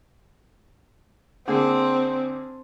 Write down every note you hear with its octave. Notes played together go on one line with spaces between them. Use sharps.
D3 A#3 C4 G#4